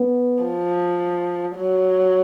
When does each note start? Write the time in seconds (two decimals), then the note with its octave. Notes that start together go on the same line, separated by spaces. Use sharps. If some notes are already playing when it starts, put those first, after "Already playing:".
Already playing: B3
0.43 F3
1.57 F#3